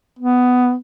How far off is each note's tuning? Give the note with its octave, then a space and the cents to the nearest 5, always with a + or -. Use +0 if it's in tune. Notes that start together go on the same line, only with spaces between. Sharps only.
B3 +10